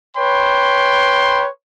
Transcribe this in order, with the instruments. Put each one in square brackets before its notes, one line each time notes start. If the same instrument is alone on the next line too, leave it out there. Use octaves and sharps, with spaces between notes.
[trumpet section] B4 C#5 G5 B5 C6